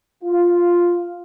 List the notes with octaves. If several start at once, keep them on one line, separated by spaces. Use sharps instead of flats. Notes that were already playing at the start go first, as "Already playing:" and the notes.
F4